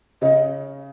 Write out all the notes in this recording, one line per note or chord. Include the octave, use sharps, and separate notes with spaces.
C#3 D#5